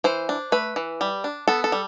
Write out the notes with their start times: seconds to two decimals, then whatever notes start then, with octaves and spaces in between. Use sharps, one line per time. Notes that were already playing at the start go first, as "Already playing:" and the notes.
0.04 E3 C5
0.29 D4
0.52 A3 B4
0.76 E3
1.01 G3
1.24 D4
1.48 B3 A4
1.64 A4
1.72 G3